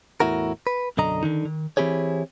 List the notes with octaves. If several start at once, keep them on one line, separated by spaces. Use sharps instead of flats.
E2 A2 E4 F#4 A#4
B4
B1 F#2 D3 D#5 A#5
D3 D#3 D#4
D#3
E3 C4 E4 G4 G#4 C#5